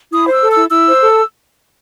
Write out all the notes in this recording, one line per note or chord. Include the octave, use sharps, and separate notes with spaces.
E4 D#6
C5 E6
A4
E4 E6
E4 E6
C5
A4